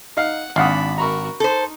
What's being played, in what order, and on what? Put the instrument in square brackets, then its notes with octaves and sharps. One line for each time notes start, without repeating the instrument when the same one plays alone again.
[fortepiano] D#4 F5 [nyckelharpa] F#5
[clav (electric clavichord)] G#1 [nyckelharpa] D4 B5 [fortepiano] F5 F#5 D#6
[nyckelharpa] F#4 A#4 [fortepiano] A#5 B5 C#6
[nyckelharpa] D#4 [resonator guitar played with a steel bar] A4 C5